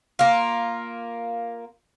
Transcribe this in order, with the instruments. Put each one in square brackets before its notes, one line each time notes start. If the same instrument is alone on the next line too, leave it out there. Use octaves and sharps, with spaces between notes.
[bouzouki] A#3 F4